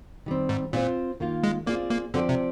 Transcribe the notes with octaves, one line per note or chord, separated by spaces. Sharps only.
D#3 G3 C4
G#2
A#2 C4 F4 C5
D#3 A#3 F4
G#3
A#3 C4 F4 G#4 D5
A#3
D3 F3 C4 G4 D5
C3